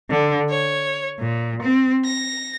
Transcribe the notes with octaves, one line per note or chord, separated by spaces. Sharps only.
D3
C#5
A#2
C4
A#6